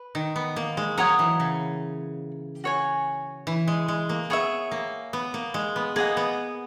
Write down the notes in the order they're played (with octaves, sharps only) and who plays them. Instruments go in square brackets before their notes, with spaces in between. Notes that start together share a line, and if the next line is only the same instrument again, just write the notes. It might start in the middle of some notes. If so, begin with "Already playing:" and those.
Already playing: [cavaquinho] B4
[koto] D#3
B3
A#3
G#3
[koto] F#3 [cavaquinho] C#5 F#5 A#5 D#6
[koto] E3
C#3
[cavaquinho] F#4 C#5 G#5
[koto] E3
G#3
G#3
A#3
[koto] B3 [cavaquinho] G#4 C#5 E5
[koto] A#3
B3
A#3
G#3
B3
[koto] A#3 [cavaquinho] G#4 D#5 F#5
[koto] B3